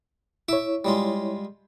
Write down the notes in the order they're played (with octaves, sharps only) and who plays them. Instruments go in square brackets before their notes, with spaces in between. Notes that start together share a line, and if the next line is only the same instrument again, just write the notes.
[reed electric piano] E4 C#5 [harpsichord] E5 D6
[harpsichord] G3 G#3 F4